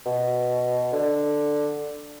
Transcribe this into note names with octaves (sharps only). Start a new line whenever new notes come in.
B2
D3